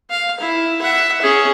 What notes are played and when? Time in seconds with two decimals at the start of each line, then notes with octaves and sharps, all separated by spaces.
0.10 F5
0.40 E4
0.81 E5 F#5
1.22 C#4 G#4